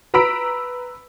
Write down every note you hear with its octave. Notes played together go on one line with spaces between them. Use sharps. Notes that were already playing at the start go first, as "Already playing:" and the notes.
B4 A#5 B5 E6 B6 D7